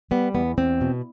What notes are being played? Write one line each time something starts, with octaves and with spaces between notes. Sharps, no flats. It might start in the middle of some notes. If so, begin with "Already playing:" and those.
G3 B3
E2 B3
E2 C4
B2